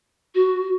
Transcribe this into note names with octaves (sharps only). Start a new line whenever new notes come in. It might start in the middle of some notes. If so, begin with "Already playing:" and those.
F#4